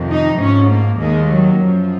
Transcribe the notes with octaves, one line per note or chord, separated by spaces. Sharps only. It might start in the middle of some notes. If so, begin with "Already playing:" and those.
Already playing: F2 C3 D#3
D#4
G#2 F3 C#4
A#3
D#2 D#3 G#3
F#3
F#2 F3